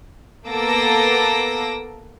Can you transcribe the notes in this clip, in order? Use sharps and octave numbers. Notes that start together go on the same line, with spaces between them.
A#3 B3 A4 D6 E6 A#6